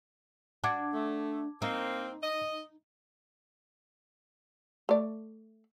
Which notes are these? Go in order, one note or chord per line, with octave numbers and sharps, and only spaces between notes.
D4 F#4 A5 D6 G#6
A3
A#3 C4 D#4
D#5
A3 D5